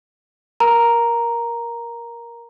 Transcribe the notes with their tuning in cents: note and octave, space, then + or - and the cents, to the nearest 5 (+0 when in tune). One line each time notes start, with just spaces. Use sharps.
A#4 +10 A#5 +0